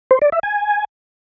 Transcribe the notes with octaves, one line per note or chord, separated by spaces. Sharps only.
C5
D5
E5
G#5